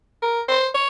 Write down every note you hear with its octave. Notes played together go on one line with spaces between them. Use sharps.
A#4
C5
C#5